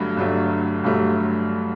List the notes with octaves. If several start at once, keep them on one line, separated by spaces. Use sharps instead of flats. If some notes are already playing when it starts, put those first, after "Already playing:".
Already playing: G1 G2 D3 F#3 A3
G1 G2 D3 F#3 A3
G1 G2 D3 F#3 A3